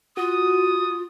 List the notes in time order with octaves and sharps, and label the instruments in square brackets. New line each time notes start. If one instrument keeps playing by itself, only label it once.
[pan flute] F4 [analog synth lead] F#4 [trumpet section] D#6